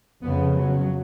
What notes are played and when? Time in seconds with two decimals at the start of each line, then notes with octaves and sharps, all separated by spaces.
0.23 F2 C#3 B3
0.57 F#3